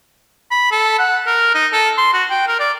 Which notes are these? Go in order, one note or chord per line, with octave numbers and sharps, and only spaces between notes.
B5
A4
F#5
A#4
D#4
A4
C6
F#4
G5
A#4
D5